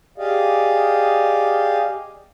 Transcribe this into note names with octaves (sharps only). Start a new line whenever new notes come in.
G4 G#4 D5 D#5 F5